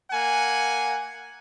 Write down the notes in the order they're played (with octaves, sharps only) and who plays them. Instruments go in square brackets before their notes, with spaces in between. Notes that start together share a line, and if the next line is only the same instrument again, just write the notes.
[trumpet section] A#3 F#5 G#5